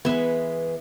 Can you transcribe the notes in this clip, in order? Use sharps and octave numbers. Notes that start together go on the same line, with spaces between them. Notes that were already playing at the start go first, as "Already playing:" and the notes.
E3 G#3 B3 B4 E5